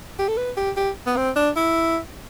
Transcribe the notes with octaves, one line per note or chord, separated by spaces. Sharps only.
G4
A4
B4
G4
G4
B3
C4
D4
E4